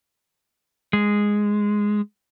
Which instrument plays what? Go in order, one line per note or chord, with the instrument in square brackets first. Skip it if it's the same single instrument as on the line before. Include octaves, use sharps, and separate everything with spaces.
[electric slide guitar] G#3